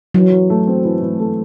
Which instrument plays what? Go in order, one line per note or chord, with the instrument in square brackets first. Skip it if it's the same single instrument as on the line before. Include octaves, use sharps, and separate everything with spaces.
[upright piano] E3 [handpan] F#3
[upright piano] E3
A3
C4
E3
E3
A3